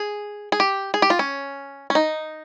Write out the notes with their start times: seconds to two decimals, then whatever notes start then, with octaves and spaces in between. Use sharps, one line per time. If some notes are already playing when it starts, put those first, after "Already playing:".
Already playing: G#4
0.52 G#4
0.60 G4
0.94 G#4
1.02 G4
1.10 F4
1.19 C#4
1.90 C#4
1.95 D#4